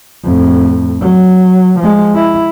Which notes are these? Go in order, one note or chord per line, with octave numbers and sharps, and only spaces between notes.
F2 A2
F#3
F3 G#3
E4